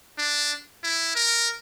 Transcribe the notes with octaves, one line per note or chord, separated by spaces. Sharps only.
D4
E4
A#4